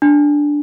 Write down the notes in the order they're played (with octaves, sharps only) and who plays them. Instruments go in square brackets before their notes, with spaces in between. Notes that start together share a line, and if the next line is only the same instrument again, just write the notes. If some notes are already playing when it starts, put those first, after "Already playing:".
[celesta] D4